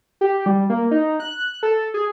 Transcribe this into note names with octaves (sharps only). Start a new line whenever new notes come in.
G4
G3
A#3
D#4
F#6
A4
G#4